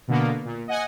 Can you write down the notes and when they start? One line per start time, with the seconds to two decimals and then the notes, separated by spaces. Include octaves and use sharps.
0.08 B2 D3 A#3 B3
0.45 A#2
0.68 D#5 F#5 G#5